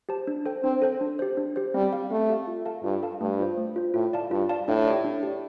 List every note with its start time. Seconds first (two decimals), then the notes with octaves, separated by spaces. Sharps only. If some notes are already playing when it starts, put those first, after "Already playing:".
0.09 G4 C5 A5
0.27 D4
0.45 A4 C5 G5
0.64 C4 D4
0.82 A4 C5 G5
1.01 D4
1.19 G4 C5
1.37 D4
1.56 G4 C5
1.74 G3 C4
1.93 G4 F5
2.10 A3 C4
2.29 G4 F5
2.47 F4
2.66 A4 F5 A5
2.84 G2 F4
3.03 A4 F5 A5
3.21 G2 A3
3.40 F4 C5
3.57 A3
3.76 F4 C5
3.94 A2 F4
4.13 D5 F5 A5
4.31 G2 F4
4.49 D5 F5 A5
4.68 A2 D4
4.86 G4 D5
5.04 D4
5.23 G4 D5